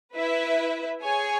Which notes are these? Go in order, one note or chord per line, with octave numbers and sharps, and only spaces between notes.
E4 B4 E5
G#4 C#5 G#5